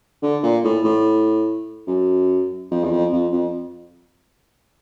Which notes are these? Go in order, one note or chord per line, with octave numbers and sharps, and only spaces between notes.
D3
A#2
A2
A2
F#2
F2
E2
F2
F2
F2